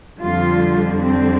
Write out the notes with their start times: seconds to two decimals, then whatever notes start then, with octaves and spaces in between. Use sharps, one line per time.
0.21 F2 D3 G3 F4
1.02 C4